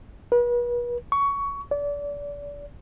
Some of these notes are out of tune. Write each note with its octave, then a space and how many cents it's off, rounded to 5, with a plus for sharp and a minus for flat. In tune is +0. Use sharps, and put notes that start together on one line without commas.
B4 -40
C#6 +15
D5 -30